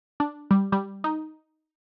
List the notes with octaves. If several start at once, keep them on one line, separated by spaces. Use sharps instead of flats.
D4
G3
G3
D#4